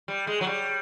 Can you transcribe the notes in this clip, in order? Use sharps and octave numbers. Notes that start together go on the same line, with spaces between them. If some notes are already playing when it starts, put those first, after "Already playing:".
G3
G#3
F#3
G3